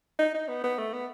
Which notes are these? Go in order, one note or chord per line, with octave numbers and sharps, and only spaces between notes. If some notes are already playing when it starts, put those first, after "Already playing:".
D#4
D#4
B3
B3
A3
B3